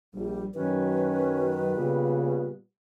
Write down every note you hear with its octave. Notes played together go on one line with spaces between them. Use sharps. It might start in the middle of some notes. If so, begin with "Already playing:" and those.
A#1 G3
F#2 D#3 F#3 C#4 B4
A#2 C#3 G3 B3